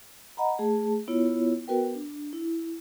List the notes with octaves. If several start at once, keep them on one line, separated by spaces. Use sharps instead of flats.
D#5 F#5 A#5 B5
A3 G#4 A5
B3 E4 F4 C#5
B3 F#4 A#4 B4 G5
D4
E4